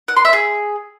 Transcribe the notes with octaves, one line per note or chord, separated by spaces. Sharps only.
F#5
C6
E5
G#4